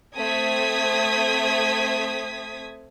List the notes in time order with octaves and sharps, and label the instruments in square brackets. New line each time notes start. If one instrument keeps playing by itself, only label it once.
[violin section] A3 C4 D#6 G#6 B6